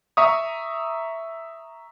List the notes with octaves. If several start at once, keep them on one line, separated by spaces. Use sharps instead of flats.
E5 A#5 C#6 D#6